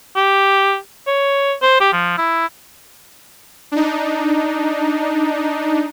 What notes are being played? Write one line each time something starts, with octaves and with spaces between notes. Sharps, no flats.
G4
C#5
C5
G4
F3
E4
D4 D#4